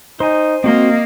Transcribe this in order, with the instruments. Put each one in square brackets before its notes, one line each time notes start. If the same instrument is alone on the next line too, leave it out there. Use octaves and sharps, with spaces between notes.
[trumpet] D#4 [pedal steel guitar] C5 G#5
[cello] A#3 [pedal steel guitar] C4 F#4 C6 [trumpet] D#5